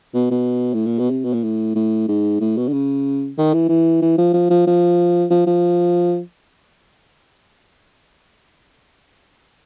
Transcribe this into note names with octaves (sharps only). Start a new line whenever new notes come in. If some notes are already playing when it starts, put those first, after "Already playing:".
B2
B2
A2
A#2
B2
C3
B2
A#2
A2
A2
G#2
A2
B2
D3
C#3
D#3
E3
E3
E3
F3
F3
F3
F3
F3
F3